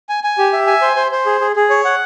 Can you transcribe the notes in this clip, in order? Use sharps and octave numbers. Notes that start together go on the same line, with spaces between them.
G#5
G#5
G4
E5
G#5
C5
C5
C5
G#4
G#4
G#4
C#5
F#5